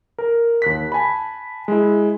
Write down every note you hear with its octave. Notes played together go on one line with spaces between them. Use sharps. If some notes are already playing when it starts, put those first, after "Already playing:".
A#4
D#2 F#6 B6
G#5 A5 B5
G#3 E4